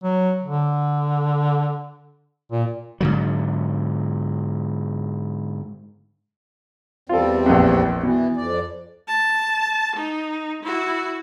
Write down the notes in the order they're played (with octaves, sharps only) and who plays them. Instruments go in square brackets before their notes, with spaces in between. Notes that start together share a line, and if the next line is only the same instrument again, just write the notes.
[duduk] F#3
D3
A#2
[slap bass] G#2 D3 F#3
[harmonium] E2 G3 C4 [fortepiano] F4 A4
[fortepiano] A#1 F2
[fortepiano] B2 [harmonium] E3
[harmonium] F2 D5
[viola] A5
D#4
E4 F#4